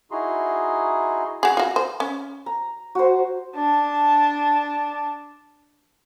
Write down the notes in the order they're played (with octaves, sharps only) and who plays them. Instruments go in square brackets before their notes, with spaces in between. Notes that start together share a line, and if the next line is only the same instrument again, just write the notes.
[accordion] D#4 E4 F#4 G#4 A#5 C6
[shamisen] F#4 G#4
F4 F#4
C5
C#4
[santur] A#5
F#4 C5
[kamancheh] D4 A5